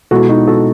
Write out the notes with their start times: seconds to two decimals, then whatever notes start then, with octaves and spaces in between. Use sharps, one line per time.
0.11 B2 G#3 B3 E4 F#4 A4
0.29 D#4 F#4
0.47 F#4 A4